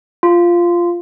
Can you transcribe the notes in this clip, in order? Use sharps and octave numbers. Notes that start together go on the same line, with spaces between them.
F4